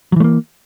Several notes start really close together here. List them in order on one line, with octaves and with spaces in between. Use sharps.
F#3 E3 A3 A#3